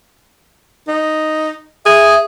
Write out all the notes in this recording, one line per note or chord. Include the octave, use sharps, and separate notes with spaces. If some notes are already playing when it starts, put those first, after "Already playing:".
D#4
G#4 E5